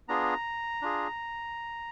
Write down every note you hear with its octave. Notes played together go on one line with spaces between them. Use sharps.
B3 D4 F4 G#4 A#5
D4 F4 G#4